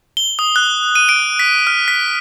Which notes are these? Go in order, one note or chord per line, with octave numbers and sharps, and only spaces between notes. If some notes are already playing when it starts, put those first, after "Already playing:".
G7
D#6
F#6
D#7
D7
B6
F6
B6